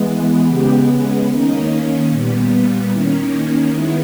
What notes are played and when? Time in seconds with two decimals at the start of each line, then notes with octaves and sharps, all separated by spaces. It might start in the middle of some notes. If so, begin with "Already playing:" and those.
Already playing: E3 G#3 B3
0.49 C#3 G#3 B3 G4
1.30 D#3 A#3 C#4 D#4
2.10 A#2 G3 B3
2.90 D#3 A#3 C#4 E4
3.31 D#4
3.71 D#3 G#3 B3 E4